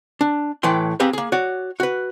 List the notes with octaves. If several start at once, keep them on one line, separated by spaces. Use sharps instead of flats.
D4
A2 E3 B4 G5 C6
A#3 C4 G4 G#4 B4
A#3 G#4
F#4 C#5 D5
F#4 B4